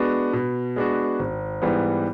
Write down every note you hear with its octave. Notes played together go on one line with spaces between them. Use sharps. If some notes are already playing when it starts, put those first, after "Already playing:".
Already playing: G#3 B3 D4 F#4
B2
G#3 B3 D4 F#4
G#1
G#2 E3 G3 B3